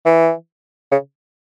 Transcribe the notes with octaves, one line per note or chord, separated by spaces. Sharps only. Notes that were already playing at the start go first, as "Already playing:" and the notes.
E3
C#3